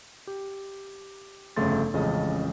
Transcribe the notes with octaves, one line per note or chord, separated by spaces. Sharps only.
G4
G1 F2 C#3 A3 C6 A6
A1 F2 C#3 G#3 D#5